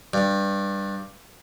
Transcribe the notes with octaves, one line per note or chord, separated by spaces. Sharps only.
G2